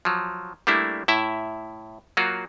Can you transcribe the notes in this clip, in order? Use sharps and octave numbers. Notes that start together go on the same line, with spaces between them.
F3 F#3
G3 A3 A#3 D4 E4
A2 E4 E5
F#3 A#3 F4 F#4